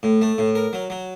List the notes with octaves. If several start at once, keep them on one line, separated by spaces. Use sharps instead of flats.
A2
A3
A2
A#4
F#3
F#3